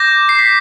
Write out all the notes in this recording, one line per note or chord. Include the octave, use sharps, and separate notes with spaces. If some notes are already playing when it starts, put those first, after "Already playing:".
Already playing: D6 G6 A#6
C7
B6